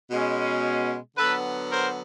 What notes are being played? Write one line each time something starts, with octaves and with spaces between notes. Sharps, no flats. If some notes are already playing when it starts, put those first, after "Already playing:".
B2 G#3 C#4
D3 F#3 B3 A4 B4
A#4 C5